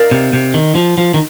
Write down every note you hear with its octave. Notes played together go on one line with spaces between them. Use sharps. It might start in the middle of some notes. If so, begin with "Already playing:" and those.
Already playing: D#4 A#4 D5 F5
C3
C3
D#3
F3
F3
D#3